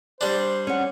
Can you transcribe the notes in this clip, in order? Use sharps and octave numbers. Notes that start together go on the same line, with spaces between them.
G3 D4 C5
C#4 F#5